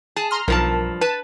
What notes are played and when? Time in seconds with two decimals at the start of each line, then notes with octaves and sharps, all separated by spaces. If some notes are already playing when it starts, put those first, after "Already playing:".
0.16 G#4 A5
0.31 A#5 C6 F6
0.48 B1 G2 F3 A#4 A5
1.01 B4 A5